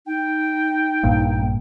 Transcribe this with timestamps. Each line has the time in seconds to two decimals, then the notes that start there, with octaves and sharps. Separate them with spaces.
0.06 D#4 G5
1.03 A#1 G2 A#3